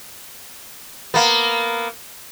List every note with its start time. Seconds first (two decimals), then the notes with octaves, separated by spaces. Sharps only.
1.14 A#3 B3